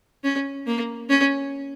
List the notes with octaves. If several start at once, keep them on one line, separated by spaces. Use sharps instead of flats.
C#4
A#3
C#4